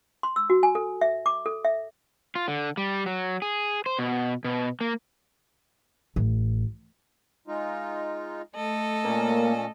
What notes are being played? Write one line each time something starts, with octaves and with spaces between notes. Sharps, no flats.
C6
E6
F#4
G#5
A4
E5
D6
A4
E5
F4
D3
G3
F#3
G#4
C5
B2
B2
A#3
A1
G#3 D#4 F4
A3 A4 D#5
A#2 A#3 C#4